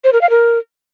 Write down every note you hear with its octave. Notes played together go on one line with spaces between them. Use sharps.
C5
A#4
F5
A#4